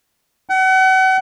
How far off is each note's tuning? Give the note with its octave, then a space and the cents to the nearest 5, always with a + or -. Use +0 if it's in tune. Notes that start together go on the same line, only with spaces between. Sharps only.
F#5 +35